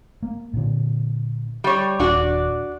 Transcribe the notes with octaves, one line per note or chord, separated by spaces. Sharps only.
A#3
A#2 D3
G3 C#5
D#1 D4 F#4 D5